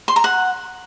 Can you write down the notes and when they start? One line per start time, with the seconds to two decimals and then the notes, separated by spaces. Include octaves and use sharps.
0.08 C6
0.16 A#5
0.24 F#5